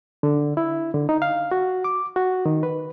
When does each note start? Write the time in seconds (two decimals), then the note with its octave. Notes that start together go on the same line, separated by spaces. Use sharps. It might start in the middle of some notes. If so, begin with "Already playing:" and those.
0.23 D3
0.57 E4
0.94 D3
1.09 D#4
1.22 F5
1.51 F#4
1.84 D6
2.16 F#4
2.46 D#3
2.63 B4